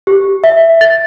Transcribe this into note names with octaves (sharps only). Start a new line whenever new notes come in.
G4
E5
A6